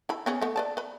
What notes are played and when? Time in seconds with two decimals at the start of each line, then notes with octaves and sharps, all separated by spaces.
0.09 E4 B5
0.26 B3 C#4 G#4
0.41 A3 B3
0.56 B4 D5 A5
0.77 B4 B5